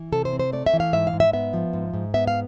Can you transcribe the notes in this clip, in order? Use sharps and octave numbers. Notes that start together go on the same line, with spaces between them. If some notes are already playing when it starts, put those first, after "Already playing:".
Already playing: E3
C3 A4
C5
C4
C5
A3 D5
E5
E3
F5
G#2 E5
F5
G#2
E5
B3 E5
F3
G#2
G#2
B3 E5
F5